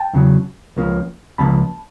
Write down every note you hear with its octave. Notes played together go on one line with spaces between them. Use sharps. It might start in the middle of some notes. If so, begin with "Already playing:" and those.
Already playing: G5 A5
E2 C#3 F#3
C#2 C#3 F3 A#3
C#2 C#3 F3 A#3 A5 B5